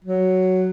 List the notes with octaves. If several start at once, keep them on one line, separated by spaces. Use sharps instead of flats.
F#3